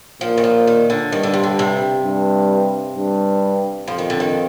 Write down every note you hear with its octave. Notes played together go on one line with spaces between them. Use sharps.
A#2 F3
D#3
F3
D#3
D3
G2 D#3
D3
C3
D3
C3
G2
G2
F2 F3
D#3
D3
D#3